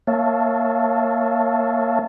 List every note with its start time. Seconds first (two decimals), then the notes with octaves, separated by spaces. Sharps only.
0.07 A#3 C#5 E5 F5 A5